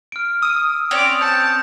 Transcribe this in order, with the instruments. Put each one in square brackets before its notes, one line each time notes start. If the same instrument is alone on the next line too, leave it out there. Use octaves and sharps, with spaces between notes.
[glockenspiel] F6 D7
[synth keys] D#6 [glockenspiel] E6 D#7
[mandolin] C4 C#4 C#5 [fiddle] D5 D6 [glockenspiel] F7
[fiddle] A5 [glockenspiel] G6 C#7